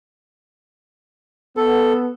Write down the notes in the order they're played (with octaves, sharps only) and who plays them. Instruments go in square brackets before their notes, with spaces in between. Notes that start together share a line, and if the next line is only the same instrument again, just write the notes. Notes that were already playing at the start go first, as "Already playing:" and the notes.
[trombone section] B3 [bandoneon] A4